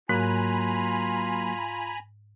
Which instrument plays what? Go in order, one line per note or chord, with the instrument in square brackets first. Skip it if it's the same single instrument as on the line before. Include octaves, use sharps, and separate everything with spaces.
[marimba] G#2 [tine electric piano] F#3 A#3 F#6 [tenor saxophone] F4 [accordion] G#5 A#5 B5